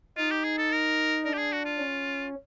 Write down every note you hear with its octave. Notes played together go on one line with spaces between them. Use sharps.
D#4 F4
G4
G#4
A4
A#4
D4 A#4
G4
G#4
F#4
F4
C#4